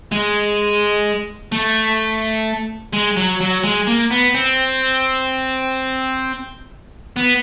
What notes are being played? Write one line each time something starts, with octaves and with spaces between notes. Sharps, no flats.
G#3
A3
G#3
F#3
F#3
G#3
A#3
B3
C4
B3